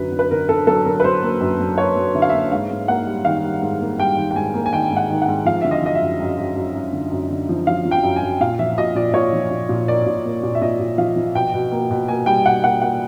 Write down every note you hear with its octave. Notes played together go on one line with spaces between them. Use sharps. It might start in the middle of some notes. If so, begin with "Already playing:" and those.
Already playing: F#2 D3 F#3 B4
D3
B4
D3 A#4
D3 A4
F#3 A4
D3 A#4
B4
F#3 C5
A#3
F#2
F#3
A#3 C#5
F#3
D3 E5
F5
A#3 E5
G#2 F5
G#2
A#3 F#5
G3
D#3 F5
G3
G#2
A#3
G3 G5
D#3
G5
G#2 G#5
A#3
G#5
D#3 G5
G#2
F#5
D#3
F#5
G#2
F3 F5
D3 E5
D#5
F3 D#5
E5
F#2
F#2
F#2
F#2
F#2
D3
F#2
D3
F3
F3 F5
F3
G5
F#2
G#5
F#2
A#2 F5
F3 E5
A#2 D#5
A#2 D5
A#2 C#5
F3
A#2
A#2
A#3 D5
A#2
A#3
A#2
E5
A#2 D#5
A#2
F3 F5
F3
B2 G5
B2
A#3
B2
A#3 G#5
G3 G5
B2 F#5
A#3 F#5
A#3 F#5